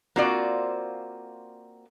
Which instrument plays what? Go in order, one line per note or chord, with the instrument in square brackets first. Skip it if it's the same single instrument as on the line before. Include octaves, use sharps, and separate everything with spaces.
[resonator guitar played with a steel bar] A#3 C4 F4 F#4 C5 D5